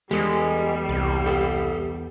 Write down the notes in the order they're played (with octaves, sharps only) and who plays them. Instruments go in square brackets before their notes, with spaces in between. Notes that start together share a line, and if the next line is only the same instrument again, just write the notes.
[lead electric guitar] E2 [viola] G3 [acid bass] G#3 [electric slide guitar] G4 A4
[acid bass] C2
[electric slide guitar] G4 A4